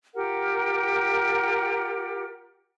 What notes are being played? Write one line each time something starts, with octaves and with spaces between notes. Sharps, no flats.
F4 G4 A#4 F#5